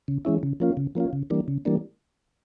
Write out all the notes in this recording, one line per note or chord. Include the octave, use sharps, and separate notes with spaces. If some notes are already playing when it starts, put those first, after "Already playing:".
C#3
E3 G#3 C#4 E4
C#3
F3 A#3 C#4 F4
C#3
F3 A#3 C#4 F4
C#3
E3 G3 A#3 D4
C#3
E3 G3 A#3 D4